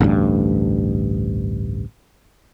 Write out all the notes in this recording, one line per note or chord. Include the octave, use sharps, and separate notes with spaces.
A1 D2 G2